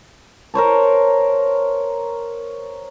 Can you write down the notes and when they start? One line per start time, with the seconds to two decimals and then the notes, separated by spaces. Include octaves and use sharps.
0.54 A#4 C5 C#5 A5